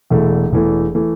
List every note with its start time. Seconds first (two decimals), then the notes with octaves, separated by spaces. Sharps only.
0.10 E1 E2 E3 A3
0.51 E1 E2 E3 A3
0.95 E3 A3